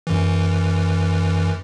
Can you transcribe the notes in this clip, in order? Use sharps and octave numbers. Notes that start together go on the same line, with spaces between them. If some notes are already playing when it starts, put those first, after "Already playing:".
F#2 E3